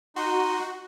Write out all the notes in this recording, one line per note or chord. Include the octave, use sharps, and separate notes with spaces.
D#4 F#4 C6